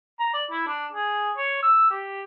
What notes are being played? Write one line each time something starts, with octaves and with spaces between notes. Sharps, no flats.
A#5
D5
E4
D4
G#4
C#5
E6
G4